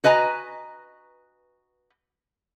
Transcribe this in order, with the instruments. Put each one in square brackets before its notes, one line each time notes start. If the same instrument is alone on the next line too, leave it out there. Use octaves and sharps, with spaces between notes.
[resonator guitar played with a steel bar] F#4 B4 D#5 G#5 A#5